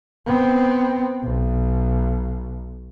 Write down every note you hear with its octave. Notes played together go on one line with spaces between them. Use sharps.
B3 C4
B1